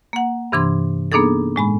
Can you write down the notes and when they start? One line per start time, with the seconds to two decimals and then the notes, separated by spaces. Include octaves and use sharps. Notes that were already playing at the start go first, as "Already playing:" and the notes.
0.13 A#3 F#5
0.52 G2 C3 E3 D4 C6 G#6
1.12 A#3 B3 D4 D#4 G#4 A4
1.56 A2 G#3 B5